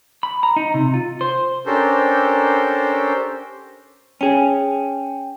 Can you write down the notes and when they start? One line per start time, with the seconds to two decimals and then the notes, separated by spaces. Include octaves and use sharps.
0.23 B5
0.43 A#5
0.56 D#4
0.74 C3
0.94 F4
1.21 C5
1.66 C#4 D4 G4 A4 A#4 C5
4.21 C#4 G#4 G5